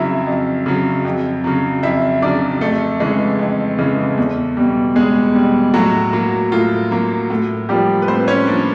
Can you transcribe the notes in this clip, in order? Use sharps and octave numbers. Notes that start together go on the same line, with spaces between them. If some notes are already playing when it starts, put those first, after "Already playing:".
Already playing: F2 C#3 F#3 E4 E5
F2
C#3 F#3
F2
C#3 F#3
F2 E4 E5
C#3 F#3 D4 D5
F2 A3 A4
C#3 E3 G#3
F2
C#3 E3 G#3
E2
B2 G3
E2 G#3 G#4
B2 G3
A2 F#3 F#4
F#3 A#3
A2 F4
F#3 A#3
A2
F3 G3 A#3 G4
B4
A2 C4 C5
C#4 C#5
F3 A#3 D4 D5